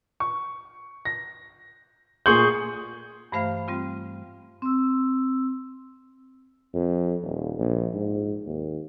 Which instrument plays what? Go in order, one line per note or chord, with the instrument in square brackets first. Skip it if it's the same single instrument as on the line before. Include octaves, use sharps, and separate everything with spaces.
[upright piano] C#6
A#6
[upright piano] A#2 C6 F#7 [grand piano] G#4 C#6 G6
[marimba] G2 E3 A3 C5 F5 F6
G3 C4 F4
[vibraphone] C4 E6
[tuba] F2
D#1
A#1
G#2
D#2